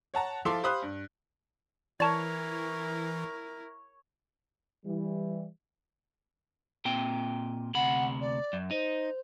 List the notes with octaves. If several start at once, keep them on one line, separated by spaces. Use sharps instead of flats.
C#5 F#5 A5 A#5
F3 E4 F4 A4 C6 D6
G4 C5 F5 B5 D#6 F#6
G2
E3 E4 A#4 C#5 D5 A5
E3 G3
A#2 C4 G5
D2 C3 F#5 B5
D5
F#2
D#4 C5